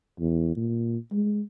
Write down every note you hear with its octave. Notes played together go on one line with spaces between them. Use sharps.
E2
A#2
G#3